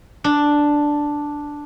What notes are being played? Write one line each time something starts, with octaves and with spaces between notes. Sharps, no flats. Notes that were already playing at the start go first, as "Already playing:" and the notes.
D4